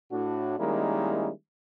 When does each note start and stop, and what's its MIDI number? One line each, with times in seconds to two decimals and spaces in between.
0.11 0.55 45
0.11 0.55 62
0.11 0.55 66
0.58 1.29 51
0.58 1.29 55
0.58 1.29 56
0.58 1.29 58
0.58 1.29 61
0.58 1.29 64